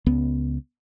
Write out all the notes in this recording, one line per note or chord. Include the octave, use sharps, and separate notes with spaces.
C#2 B3